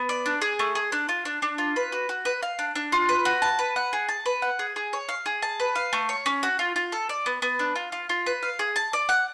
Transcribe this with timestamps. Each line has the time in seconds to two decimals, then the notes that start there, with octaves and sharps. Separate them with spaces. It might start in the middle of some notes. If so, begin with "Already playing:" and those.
Already playing: B3
0.09 D5
0.26 D4
0.42 G#4
0.59 A3
0.75 G#4
0.92 D4
1.09 F4
1.25 D4
1.42 D4
1.58 F4
1.76 B4
1.92 F#4
2.09 F#4
2.25 B4
2.43 F5
2.59 D4
2.76 D4
2.92 F4
3.09 B4
3.25 F#4
3.42 A5
3.59 B4
3.76 F#5
3.93 G#4
4.09 A5
4.26 B4
4.42 F#5
4.59 G#4
4.76 G#4
4.93 C#5
5.09 F5
5.26 G#4
5.42 A5
5.60 B4
5.75 F5
5.93 A3
6.09 C#5
6.26 C#4
6.43 F#4
6.59 F4
6.76 F4
6.92 A4
7.09 D5
7.26 B3
7.42 B3
7.59 D4
7.76 F4
7.92 F4
8.09 F4
8.26 B4
8.43 F5
8.59 G#4
8.76 A5
8.93 D5
9.09 F#5